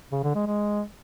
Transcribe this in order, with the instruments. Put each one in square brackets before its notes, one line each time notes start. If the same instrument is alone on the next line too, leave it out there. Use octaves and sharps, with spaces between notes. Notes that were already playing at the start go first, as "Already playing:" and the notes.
[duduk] C#3
D3
G#3
G#3